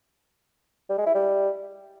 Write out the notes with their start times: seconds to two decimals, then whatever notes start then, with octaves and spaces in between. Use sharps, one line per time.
0.90 G3
0.98 G#3
1.06 E4
1.15 G3